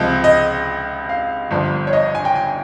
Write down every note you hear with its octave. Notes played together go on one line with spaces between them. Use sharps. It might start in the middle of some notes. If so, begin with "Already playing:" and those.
Already playing: C#2 C3 F3 D#5
D#5
F5
G1 G2 F3
C#5
D#5
G#5
G5
G#5